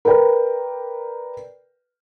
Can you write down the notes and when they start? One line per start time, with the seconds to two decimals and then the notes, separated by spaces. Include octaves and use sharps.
0.05 A#4 B4 D5 G5